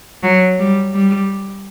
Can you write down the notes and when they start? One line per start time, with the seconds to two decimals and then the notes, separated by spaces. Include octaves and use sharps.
0.23 F#3
0.59 G3
0.94 G3